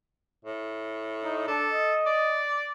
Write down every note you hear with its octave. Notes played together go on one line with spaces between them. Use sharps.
A2
D#4
D4 A4
D#5
D5